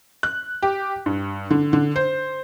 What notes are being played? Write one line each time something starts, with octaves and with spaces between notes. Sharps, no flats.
F#6
G4
G2
D3
D3
C5